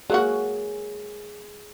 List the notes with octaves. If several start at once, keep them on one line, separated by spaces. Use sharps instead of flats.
F#3 A#3 F#4 G#4